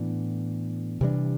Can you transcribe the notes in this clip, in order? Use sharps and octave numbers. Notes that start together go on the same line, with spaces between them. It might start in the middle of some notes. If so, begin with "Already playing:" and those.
Already playing: A2 E3 B3 D4
C3 E3 G3 D4